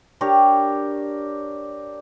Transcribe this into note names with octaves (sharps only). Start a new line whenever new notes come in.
D4 G4 A#4 C#5